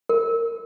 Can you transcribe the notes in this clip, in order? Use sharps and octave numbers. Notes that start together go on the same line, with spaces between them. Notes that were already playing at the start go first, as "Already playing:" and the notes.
A#4